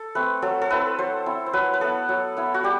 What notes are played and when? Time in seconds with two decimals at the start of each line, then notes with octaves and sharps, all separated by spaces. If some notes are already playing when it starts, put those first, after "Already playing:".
Already playing: A4
0.15 A3 C4 B4
0.42 F#3 A4
0.61 A4
0.70 C4 E4 B4
0.98 F#3 C5
1.26 C4 E4
1.46 C5
1.53 F#3 B4
1.74 B4
1.81 B3 E4 A4
2.09 F#3
2.37 B3 E4
2.54 F#4
2.63 G3 G4